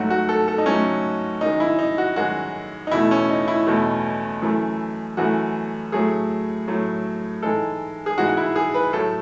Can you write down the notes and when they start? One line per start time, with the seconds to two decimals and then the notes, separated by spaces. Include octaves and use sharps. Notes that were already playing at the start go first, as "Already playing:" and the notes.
Already playing: G#2 F#3 A3 F#4
0.10 F#4
0.29 A4
0.48 A4
0.58 D#4
0.66 G#2 F#3 A3 C#4
1.41 F#2 D#3 G#3 D#4
1.60 E4
1.79 D#4
1.98 F#4
2.16 F#2 D#3 G#3 F#4
2.87 D#4
2.91 E2 B2 A3 E4
3.11 C#4
3.29 D#4
3.48 E4
3.67 E2 B2 A3
4.42 F#2 E3 A3
5.17 F#2 E3 A3 F#4
5.92 A2 F#3 A3 G#4
6.68 A2 F#3 A3
7.43 G#2 E3 G#3 A4
8.06 G#4
8.18 G#2 E3 G#3 F#4
8.29 F#4
8.37 E4
8.56 G#4
8.74 B4
8.93 A2 F#3 A3 A4